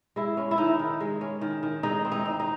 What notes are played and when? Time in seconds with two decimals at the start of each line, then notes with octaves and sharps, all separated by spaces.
0.16 G#3 E4
0.37 C#4
0.51 E4
0.58 D#3 D#4
0.79 D#3
1.00 G#3
1.21 C#4
1.41 D#3
1.63 D#3
1.83 G#3 D#4
2.05 C4
2.12 D#4
2.25 D#4
2.40 D#4